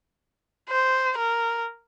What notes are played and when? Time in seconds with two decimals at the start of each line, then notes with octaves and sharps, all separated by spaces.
0.70 C5
1.18 A#4